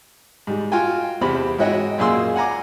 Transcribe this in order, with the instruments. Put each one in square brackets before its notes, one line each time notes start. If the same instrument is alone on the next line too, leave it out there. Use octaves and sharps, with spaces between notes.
[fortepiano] G#2 G3
F4 F#4 G5 G#5
E2 C3 C5 B5
G#2 E4 F#4 C#5 D#5 G5
F#2 A#2 G#4 F5 C6 E6
F#5 G#5 A#5 D6